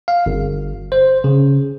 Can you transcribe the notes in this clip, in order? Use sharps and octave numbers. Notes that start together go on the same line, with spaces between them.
F5
G1
C5
C#3